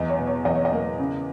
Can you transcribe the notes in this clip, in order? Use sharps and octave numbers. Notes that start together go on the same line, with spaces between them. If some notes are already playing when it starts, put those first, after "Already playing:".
Already playing: E2 D#5
C#5
B2
C#5
E2 D#5
C#5
D#5
A#3
C#3